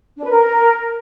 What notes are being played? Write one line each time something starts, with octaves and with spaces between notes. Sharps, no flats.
D4
B4
A#4